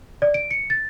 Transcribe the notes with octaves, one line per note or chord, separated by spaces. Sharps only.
D5
D7
C#7
A6